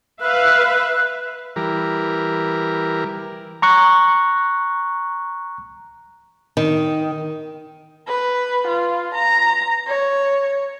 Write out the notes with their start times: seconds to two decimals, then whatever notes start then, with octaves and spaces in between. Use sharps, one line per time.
0.21 B4 E5 F5 F#6
1.56 E3 G3 A#4
3.62 A#5 C#6 F#6
6.57 D#3
8.07 B4
8.67 F4
9.15 A#5
9.87 C#5